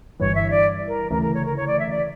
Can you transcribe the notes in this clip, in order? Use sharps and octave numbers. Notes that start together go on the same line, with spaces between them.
G1 G2 E3 C#5
E5
D5
A#4
D2 C#3 E3 A3 A#4
A#4
C#5
A#4
C#5
D5
E5
D5